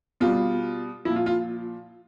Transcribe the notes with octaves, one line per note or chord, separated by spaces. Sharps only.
B2 G3 F4
A#2 F3 E4
F4
F4